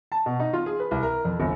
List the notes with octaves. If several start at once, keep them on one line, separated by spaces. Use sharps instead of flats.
A5
B2
D#4
F4
G#4
B4
C2
A#4
F2
G1